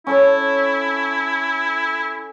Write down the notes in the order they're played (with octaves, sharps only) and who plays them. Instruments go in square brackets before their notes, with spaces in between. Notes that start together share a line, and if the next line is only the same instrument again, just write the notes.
[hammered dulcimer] C#4 A4 C#5 [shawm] E4